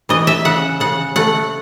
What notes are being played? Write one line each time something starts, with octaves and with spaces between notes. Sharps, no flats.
E3 D#5
E5
C#3 F#5
C#3 F#5
A3 F#5